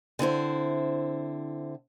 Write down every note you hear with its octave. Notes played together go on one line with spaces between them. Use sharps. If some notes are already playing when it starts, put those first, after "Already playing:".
D3 C4 E4 C5